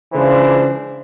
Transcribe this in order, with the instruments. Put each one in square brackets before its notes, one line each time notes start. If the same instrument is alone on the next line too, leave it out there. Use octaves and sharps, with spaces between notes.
[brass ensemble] C#2 C#3 E3 F3 D4 C5